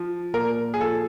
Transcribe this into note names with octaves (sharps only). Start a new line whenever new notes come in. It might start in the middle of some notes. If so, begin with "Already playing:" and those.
Already playing: F3
A#2 A#4
G#4
F3 A4